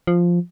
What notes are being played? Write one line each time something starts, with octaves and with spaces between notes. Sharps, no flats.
F3